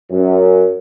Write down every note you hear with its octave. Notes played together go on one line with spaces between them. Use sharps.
F#2